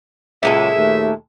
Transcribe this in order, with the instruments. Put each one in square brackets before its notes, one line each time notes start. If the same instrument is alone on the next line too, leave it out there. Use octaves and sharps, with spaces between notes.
[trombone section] C#2 C#3 F#3 [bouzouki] A#2 G#3 A4 [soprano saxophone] E5
[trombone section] D#2 A3